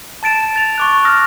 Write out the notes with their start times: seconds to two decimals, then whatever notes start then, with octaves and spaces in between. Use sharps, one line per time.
0.23 A5 A6 D7 E7
0.56 A6 F7
0.78 C#6 D6 F#6
1.05 D#6 F6 A#6